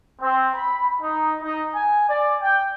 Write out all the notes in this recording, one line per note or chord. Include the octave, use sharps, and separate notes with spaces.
C4
B5
D#4
D#4
G#5
D5
G5